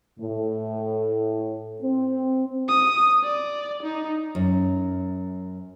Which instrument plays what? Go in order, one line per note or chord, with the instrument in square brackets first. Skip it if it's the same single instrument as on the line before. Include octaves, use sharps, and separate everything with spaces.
[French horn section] A2
C4
[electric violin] D#6
D5
D#4
[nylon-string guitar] F#2